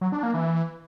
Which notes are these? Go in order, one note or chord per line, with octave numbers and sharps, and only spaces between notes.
F#3
D4
A#3
E3